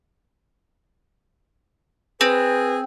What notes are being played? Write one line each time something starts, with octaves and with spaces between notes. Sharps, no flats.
C4 G#4 B4